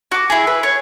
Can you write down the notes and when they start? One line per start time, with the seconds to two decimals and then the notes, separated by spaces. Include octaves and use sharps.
0.12 F#4 D6
0.30 E4 G#4
0.47 B4
0.63 C#5